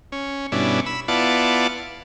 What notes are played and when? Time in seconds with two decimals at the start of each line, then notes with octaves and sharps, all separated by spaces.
0.12 C#4
0.52 G2 B2 C#4 D4 E4
0.86 B5 E6
1.08 B3 E4 F4 D5 F#5 A5